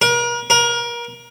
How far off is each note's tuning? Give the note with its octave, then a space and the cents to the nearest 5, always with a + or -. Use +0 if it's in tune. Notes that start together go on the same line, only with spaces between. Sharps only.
A#4 +40
A#4 +30